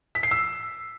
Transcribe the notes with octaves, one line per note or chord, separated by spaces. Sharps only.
B6
C7
E6